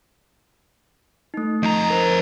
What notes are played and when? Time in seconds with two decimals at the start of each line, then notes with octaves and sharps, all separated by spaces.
1.34 A3 D#4
1.63 F2 D#5 A#5
1.90 A#4 C5